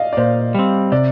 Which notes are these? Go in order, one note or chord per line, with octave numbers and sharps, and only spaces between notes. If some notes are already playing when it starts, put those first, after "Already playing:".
Already playing: D5 D#5 F5
D5
A#2 C5
G3 C4
C3 D5